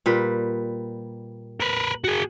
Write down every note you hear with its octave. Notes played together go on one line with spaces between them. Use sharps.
A#2 G3 B4
A#4 B4
F#4 G#4